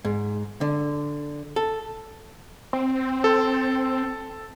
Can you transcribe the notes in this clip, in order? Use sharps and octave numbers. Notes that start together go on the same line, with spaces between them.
G#2
D3
A4
C4
A4